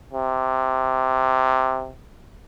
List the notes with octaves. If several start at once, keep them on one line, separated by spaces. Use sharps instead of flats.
C3